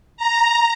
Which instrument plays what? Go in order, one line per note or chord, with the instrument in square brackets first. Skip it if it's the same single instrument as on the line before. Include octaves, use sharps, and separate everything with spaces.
[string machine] A#5